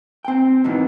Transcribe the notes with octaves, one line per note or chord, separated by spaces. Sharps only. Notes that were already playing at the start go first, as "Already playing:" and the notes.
C4 G5
G#2 B2 D#3 E3